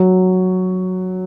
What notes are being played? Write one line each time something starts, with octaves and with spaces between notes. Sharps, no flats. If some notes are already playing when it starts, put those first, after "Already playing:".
Already playing: F#3